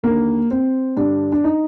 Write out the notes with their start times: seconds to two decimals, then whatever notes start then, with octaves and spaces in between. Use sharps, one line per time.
0.03 D#2 D3 A#3
0.51 C4
0.97 G2 D3 D4
1.32 D4
1.44 D#4